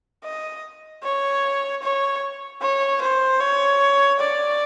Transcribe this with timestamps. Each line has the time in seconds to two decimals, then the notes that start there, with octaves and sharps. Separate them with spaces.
0.24 D#5
1.04 C#5
1.83 C#5
2.62 C#5
3.02 C5
3.40 C#5
4.20 D5